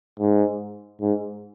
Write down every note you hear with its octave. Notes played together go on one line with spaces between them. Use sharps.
G#2
G#2